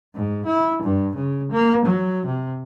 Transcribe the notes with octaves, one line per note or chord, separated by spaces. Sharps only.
G#2
E4
G2
C#3
A#3
F#3
C3